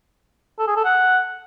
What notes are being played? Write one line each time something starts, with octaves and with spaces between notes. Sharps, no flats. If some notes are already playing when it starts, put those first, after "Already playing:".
A4
G#4
A4
F#5